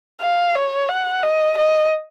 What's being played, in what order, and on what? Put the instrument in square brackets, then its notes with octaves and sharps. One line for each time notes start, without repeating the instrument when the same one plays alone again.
[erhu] F5
C#5
F#5
D#5
D#5